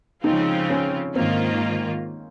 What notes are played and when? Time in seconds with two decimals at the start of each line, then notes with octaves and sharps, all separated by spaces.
0.23 C#3 F3 G#3 C4 D#4 F4
0.70 C#4
1.15 G#2 D#3 A#3 C4 F4